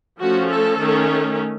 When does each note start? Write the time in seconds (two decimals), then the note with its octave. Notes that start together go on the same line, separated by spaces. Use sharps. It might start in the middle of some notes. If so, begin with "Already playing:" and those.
0.19 F3 A3 C#4 F#4
0.49 A4
0.78 D#3 A3 C#4